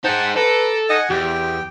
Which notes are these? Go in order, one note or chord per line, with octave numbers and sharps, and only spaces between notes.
D#4 G#4 C5 F#5 G5 A5
A4 B4 A#5 D6
D#5 F#5 G#5
E2 G4 G5